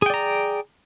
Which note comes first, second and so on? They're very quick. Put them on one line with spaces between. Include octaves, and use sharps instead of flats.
G#4 G5 D5 A#5